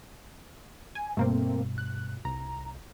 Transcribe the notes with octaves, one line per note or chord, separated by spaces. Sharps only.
G#5
G2 B2 A3 A#3 C4
F#6
C2 A#5